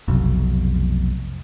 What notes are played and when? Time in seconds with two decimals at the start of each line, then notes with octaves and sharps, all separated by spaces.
0.08 F1 B1